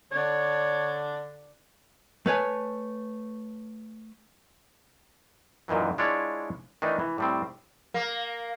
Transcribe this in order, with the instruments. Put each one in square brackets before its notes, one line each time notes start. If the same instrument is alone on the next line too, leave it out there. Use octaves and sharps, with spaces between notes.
[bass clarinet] D3 [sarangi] D4 [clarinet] C#5
[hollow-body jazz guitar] A3 B4 C#5 G#5
[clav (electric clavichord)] F#2 A#2 D#3 E3 F#3
G#3 D4 E4 F4 C#5 D5
D#3 E3 A3 D4 D#4
E3
A2 G3 C4
[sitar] A#3